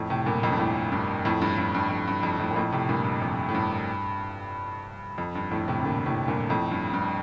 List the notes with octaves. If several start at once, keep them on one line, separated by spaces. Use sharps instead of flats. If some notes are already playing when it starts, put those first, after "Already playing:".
Already playing: F2 A2
A2 C3
G2 A#2
F2 A2
G2
F2 A2
G2
F2 A2
G2
G2
G2
F2
G2
F2
F2 A2
A#2
F2 A2
A2 C3
G2 A#2
G2
F2
A2
G2
F2
G2
F2 A2
A2 C3
C3
A#2 D3
A2 C3
G2 A#2
F2 A2
G2
G2